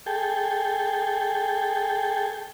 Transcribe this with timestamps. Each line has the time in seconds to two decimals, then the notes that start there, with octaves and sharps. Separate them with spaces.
0.06 G#4 A4 G5